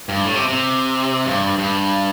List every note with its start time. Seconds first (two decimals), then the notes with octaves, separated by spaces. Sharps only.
0.09 G2
0.25 A2
0.36 C3
0.48 C3
1.25 G2
1.58 G2